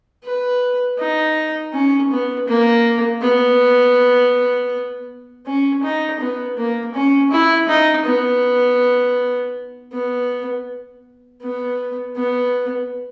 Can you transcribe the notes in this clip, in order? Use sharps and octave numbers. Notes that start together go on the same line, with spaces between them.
B4
D#4
C#4
B3
A#3
B3
C#4
D#4
B3
A#3
C#4
E4
D#4
B3
B3
B3
B3